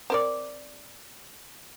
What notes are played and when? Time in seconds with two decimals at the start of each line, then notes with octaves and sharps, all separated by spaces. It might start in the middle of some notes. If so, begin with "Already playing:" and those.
0.10 C4 A#4 D5